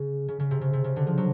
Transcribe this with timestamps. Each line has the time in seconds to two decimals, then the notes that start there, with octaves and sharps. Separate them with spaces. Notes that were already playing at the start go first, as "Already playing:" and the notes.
Already playing: C#3
0.28 C#3
0.40 C#3
0.51 C3
0.61 C#3
0.73 C3
0.84 C#3
0.96 D3
1.07 F3
1.17 F#3